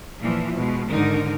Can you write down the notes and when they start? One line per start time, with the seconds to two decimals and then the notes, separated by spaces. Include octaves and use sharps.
0.20 A#2 E3 F3
0.57 B2 G#3
0.91 G#2 D3 D#3 D#4 A#4